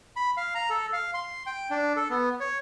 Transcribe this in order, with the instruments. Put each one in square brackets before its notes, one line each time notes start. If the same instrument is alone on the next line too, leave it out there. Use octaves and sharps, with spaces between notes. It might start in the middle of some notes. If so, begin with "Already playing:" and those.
[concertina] B5
F5
A#5
A4
F5
C6
G5
D4
A4
B3
C#5